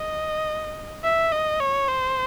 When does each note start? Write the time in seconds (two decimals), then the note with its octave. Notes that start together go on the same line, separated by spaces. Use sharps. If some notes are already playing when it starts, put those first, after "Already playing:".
Already playing: D#5
1.04 E5
1.32 D#5
1.60 C#5
1.88 C5